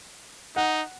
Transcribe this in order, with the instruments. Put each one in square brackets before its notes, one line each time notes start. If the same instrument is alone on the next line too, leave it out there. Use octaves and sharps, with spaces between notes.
[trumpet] D#4 [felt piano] F#5